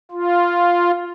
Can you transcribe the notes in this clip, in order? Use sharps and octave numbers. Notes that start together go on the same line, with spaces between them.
F4